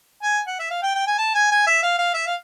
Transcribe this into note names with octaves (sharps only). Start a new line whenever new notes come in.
G#5
F#5
E5
F5
G5
G5
G#5
A5
G#5
G#5
E5
F5
F5
E5
F5